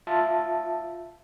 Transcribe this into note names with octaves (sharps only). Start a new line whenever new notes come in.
F4 E5 A5